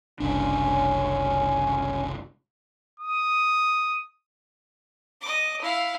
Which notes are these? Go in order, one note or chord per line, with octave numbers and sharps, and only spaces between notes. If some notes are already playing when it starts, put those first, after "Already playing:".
F#1 C2 C#4 D4
D#6
D#5 D6
E4 F5